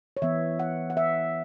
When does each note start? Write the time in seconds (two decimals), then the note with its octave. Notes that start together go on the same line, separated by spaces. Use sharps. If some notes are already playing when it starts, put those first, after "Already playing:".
0.17 C#5
0.22 E3 B3 E5
0.59 F#5
0.90 F#5
0.97 E5